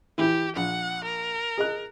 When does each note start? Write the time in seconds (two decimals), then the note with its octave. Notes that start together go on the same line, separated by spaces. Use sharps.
0.18 E3 E4 G4
0.56 A#1 F#5
1.04 A#4
1.58 G#4 D#5 F#6